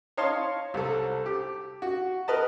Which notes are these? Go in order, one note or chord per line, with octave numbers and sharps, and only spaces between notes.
C#5 D#5 F5 A5 C6
C2 A4
G4
F#4
A#4 B4 D#5 A5